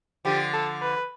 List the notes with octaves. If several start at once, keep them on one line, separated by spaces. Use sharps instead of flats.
D3 F3 G4
A4
B4